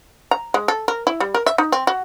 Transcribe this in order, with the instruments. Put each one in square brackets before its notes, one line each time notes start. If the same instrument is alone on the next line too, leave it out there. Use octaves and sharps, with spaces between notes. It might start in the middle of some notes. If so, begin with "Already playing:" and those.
[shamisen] A#5
G#3
A4
A#4
E4
G3
A#4
E5
D#4
C4
F#4